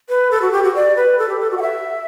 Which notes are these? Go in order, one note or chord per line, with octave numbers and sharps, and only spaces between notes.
B4
A4
F#4
G4
F#4
D5
B4
A4
G4
A4
F#4
F#5
E5